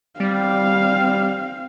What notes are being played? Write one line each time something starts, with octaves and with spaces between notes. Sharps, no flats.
G3 C4 F5